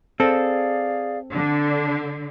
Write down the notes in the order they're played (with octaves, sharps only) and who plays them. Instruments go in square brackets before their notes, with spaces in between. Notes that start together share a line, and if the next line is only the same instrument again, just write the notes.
[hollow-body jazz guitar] C4 A4 [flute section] G#4 D5 F5
[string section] D3 [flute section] D4